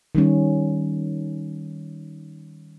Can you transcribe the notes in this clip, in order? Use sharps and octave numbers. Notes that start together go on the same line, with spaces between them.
D#3 G3 C#4